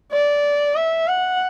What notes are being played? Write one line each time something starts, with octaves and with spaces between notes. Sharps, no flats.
D5
E5
F#5